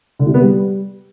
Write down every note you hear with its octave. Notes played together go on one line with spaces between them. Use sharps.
D3
C3
B3
G3